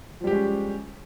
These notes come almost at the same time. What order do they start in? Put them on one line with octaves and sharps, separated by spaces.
F3 G3 G4 G#3 C#4